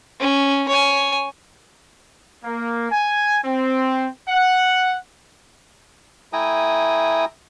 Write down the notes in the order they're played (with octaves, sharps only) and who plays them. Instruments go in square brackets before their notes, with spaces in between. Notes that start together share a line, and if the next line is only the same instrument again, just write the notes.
[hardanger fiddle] C#4
C#5 G#5
[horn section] A#3
G#5
C4
F#5
[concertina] A3 E4 G5 G#5 A#5 D#6